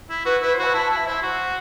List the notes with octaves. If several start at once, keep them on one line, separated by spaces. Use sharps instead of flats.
E4
F#4 B4
E4 B4
C5
F#4 B5
E4 A5
E4 A5
E5
E4 C5
F#4